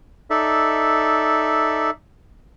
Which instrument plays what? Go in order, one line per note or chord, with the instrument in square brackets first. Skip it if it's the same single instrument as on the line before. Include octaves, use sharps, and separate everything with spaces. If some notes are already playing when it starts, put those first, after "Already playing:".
[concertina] D#4 A4 D5 E5